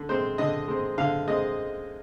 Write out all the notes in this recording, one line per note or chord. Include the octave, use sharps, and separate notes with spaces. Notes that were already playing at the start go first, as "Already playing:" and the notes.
Already playing: D3
G#3 C4 C5
D3 D#5
G#3 C4
D3 F5
G#3 C4 D#5